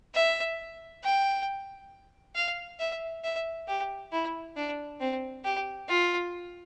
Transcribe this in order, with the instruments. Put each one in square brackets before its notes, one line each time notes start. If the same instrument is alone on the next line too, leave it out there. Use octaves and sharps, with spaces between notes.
[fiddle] E5
G5
F5
E5
E5
G4
E4
D4
C4
G4
F4